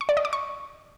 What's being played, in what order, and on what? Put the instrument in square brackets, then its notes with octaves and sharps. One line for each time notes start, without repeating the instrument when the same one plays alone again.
[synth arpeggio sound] C#6
D5
D#5
D6
C#6